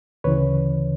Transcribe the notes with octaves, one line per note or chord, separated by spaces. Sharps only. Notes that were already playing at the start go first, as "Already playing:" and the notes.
D2 C#3 E3 B4 C#5